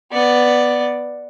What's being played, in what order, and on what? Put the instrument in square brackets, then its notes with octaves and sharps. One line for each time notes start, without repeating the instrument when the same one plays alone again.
[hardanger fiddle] B3 D5